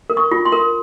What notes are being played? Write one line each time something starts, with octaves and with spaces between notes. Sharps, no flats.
A#4
C#6
F4
C6
A#4